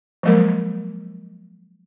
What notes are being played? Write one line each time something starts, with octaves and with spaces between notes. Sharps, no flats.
F3 F#3 G#3 A#3 A#4